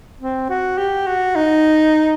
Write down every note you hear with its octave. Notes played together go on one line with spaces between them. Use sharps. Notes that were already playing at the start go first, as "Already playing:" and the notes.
C4
F#4
G4
F#4
D#4